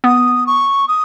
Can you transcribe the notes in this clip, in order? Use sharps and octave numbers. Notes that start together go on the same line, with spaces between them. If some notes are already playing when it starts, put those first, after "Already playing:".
B3 D#6
C#6
D#6